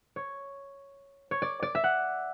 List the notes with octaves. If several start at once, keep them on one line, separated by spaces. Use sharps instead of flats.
C#5
C#5
D5
D5
E5
F#5